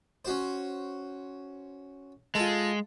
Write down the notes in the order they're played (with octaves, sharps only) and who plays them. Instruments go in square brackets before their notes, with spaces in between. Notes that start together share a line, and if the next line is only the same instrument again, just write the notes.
[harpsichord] C#4 F#4 C5
[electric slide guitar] G#3 [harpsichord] F4 A4